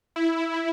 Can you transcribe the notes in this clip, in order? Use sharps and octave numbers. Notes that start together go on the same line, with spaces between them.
E4